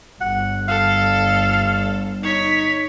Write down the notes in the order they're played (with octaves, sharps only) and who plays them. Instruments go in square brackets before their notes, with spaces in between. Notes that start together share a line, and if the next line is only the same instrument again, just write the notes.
[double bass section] G1 [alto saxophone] F#5
[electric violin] A4 [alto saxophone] F5
[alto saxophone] D#4 [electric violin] C#5 B6